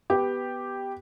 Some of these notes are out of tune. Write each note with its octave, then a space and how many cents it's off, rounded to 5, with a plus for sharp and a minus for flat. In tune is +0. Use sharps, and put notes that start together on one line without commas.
B3 +0 G4 +0